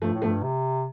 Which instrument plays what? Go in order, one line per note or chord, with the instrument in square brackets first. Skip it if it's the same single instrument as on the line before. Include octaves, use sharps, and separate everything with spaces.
[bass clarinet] G2 [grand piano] F3 A3
[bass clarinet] A2
[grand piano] F3 A3
[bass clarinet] G2
C3